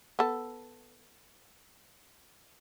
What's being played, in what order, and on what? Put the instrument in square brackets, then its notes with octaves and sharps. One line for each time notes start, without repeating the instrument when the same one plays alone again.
[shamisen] B3 A4